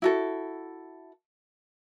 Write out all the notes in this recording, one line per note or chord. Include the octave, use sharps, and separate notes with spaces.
E4 F#4 A4